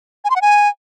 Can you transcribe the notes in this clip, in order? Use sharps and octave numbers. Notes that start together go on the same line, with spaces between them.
G#5
C6
F#5
G#5